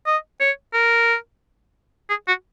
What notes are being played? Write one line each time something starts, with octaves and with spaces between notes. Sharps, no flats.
D#5
C#5
A#4
G#4
F#4